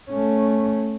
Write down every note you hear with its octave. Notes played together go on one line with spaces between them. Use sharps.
A3 C#4